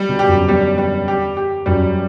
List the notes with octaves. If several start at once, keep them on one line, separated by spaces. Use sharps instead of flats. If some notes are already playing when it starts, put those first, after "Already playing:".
Already playing: G3
B2 D3
G4
F#2
E2 G3
G3
G4
G4
F#2 G3